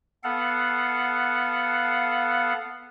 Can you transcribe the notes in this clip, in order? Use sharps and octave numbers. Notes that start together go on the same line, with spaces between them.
B3 A4 F5 F#5